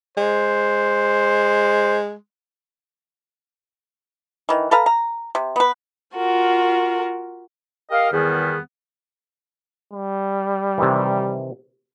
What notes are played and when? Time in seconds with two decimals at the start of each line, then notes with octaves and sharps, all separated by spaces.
0.17 G#3 C5
4.49 D#3 E3
4.71 A4 B4 F5 A#5
4.86 A#5
5.35 C3
5.56 B3 B4
6.16 F4 F#4 A#4
7.91 G4 A#4 D#5 F5
8.11 E2 D#3 G3 B3 G#4
9.93 G3
10.78 C3 D#3 E3